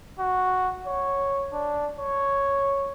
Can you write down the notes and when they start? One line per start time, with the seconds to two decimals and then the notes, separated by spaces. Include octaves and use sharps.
0.19 F#4
0.87 C#5
1.53 D4
1.99 C#5